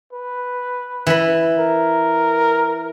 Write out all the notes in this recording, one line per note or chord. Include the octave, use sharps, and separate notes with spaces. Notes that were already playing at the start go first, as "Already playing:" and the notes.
B4
E3 B5
A#4